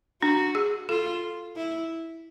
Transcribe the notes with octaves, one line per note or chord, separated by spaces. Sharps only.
D4 F#4
G#4
F4 A4
E4